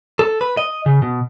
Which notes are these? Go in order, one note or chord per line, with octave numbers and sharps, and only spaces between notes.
A4
B4
D#5
C#3
B2